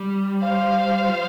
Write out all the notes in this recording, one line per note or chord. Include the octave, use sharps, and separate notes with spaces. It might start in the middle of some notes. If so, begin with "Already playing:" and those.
Already playing: G3
C5 F5
F3